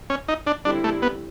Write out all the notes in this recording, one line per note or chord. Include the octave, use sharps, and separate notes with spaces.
C#4
D#4
D4
D3 G3 C4 D4 E4
A3
B3